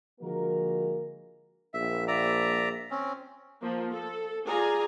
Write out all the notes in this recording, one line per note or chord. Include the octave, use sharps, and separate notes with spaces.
D3 F3 G#3 A#3 F#4 A#4
A#1 E5
D5 E5 A#5
C4 C#4
F3 A#3
A4
F4 G#4 D5 G#5 A#5